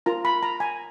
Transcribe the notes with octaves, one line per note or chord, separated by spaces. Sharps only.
F4 A#4 A#5
B5
A#5
G#5